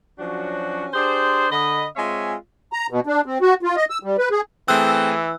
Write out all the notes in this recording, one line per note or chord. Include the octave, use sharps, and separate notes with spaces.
F3 F#3 C#4 D4 F#4
D4 G4 G#4 C5
D3 D#5 B5
G#3 C4 F4 C#5 E5 G#5
A#5
B2
D4
C4
F#4
F4
D#5
E6
G3
B4
G#4
E3 A3 C4 G#4 E6 F#6